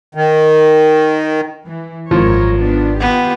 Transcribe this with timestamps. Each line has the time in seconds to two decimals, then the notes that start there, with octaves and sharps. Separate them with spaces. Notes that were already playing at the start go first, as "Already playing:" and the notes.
0.15 D#3
1.65 E3
2.11 G#1 F#2 F3 A#4 C#5
2.56 D#3 B3 D4
3.00 B3 F4 G4